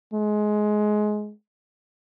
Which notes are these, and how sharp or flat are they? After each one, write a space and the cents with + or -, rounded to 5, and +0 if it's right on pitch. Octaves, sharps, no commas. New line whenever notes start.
G#3 +20